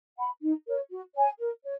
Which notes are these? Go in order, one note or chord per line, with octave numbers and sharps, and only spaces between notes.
F#5 B5
D#4
A#4 C#5
F#4
C#5 G#5
A#4
C#5